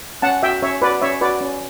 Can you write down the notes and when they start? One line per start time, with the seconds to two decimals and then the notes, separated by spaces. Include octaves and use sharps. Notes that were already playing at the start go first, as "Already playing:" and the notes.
0.22 C#4 F#5 A5
0.43 F#4 E5 G5
0.62 C#4 C#5 E5
0.82 F#4 B4 D5
1.02 C#4 C#5 E5
1.21 F#4 B4 D5
1.41 C#4